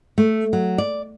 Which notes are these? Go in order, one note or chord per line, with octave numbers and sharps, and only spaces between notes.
A3
F#3
D5